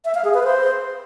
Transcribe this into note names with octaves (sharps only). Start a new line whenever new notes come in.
E5
F5
G#4
B4
C5